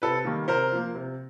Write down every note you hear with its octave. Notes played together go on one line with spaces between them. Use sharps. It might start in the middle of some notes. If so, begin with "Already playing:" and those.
C3 A4 B4
D#3 G3 A#3
C3 A#4 C5
F3 A#3
C3